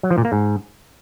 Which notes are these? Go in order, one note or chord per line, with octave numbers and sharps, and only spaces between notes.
F#3
F3
A#2
A#3
G#2